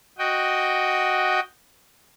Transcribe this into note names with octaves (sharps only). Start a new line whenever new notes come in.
F#4 D#5 G5